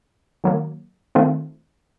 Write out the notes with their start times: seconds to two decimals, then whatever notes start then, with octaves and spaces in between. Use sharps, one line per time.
0.44 D#3 F#3 A#3
1.15 D#3 A3 C4 F4